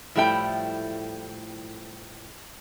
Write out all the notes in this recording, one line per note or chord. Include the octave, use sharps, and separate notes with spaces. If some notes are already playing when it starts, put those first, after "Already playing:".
A2 F3 G3 A3 E4 G5